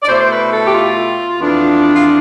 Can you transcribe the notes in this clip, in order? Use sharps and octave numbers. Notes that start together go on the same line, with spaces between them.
D5
B2 A3 E4 C5
C5
B4
A4
G4
F4
F2 E3 B3 D4 F4
F4